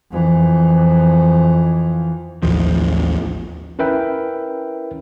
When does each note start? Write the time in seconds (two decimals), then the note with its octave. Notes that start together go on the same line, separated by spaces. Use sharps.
0.11 F2 E3
2.43 A1 D#2 F3
3.79 C#4 E4 A#4 B4 E5 G5